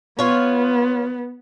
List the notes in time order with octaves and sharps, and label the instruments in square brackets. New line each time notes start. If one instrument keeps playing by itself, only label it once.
[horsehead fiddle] B3 [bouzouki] F4 C#5